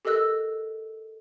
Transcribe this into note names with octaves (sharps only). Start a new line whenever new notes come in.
G4 A4 A#4 D#5 E6 F#6